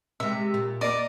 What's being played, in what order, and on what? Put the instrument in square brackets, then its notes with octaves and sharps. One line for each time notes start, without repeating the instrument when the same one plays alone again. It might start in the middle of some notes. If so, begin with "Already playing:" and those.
[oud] C3 G#3 [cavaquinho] E5
[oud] A#2
[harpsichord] A#3 D#5 [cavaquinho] D5